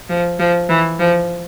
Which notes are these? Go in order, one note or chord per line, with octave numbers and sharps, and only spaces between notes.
F3
F3
E3
F3